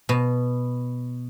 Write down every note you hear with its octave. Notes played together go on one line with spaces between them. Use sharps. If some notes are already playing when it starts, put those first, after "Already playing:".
B2